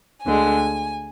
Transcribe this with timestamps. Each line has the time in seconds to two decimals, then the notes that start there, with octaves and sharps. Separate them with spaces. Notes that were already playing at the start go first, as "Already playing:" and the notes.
0.24 D2 D3 G#3 G#5